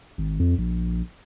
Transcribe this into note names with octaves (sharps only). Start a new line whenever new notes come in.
G#1
F2
A#1